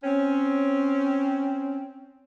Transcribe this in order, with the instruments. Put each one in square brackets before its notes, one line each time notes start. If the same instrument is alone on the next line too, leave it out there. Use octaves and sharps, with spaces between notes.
[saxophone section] C4 C#4